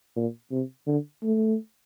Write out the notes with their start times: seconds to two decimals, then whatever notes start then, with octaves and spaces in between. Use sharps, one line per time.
0.16 A#2
0.51 C3
0.87 D3
1.23 A3